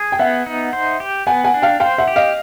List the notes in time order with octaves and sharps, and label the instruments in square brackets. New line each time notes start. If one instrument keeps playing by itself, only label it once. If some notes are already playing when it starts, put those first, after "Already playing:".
Already playing: [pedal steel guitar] G#4
[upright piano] G5
[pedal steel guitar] B3 [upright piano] E5 F#5
[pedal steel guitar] D#4
C5
G4
[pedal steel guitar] B3 [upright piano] F#5 G#5
[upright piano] F#5 G#5
[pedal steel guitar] D4
[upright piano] F5 G5
[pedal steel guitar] C5 [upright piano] F5 G5
[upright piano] E5 F#5
[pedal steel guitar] G4
[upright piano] D#5 F5